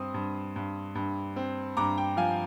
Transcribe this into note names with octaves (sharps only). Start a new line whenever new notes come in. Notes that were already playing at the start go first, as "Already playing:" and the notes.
Already playing: G2 C4 C6 D#6
G2
G2
G2
C4
G2 A#5 D6
G5
F3 F5 G#5